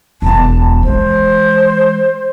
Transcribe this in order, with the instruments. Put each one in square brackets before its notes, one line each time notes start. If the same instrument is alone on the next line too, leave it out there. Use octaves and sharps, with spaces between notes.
[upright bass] E1 E2 [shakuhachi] A5
[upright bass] E3 G#3 [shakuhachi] C5